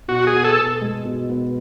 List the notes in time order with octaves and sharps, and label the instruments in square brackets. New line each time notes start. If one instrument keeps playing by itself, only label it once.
[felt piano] B2 [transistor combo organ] F#4
[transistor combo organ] G#4
[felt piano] B3
[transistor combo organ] A4
[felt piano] B2
G#3
B2
B3